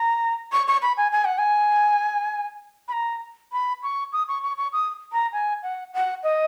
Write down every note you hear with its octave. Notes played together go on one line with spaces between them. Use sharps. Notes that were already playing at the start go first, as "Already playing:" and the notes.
Already playing: A#5
C#6
C#6
B5
G#5
G#5
F#5
G#5
B5
A#5
B5
C#6
D#6
C#6
C#6
C#6
D#6
A#5
G#5
F#5
F#5
D#5